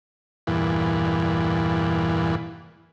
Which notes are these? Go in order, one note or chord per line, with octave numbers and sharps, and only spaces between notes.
E2 G2 A#2 E3